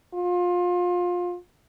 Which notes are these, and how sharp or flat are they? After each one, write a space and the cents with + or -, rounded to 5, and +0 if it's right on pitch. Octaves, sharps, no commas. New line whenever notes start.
F4 +25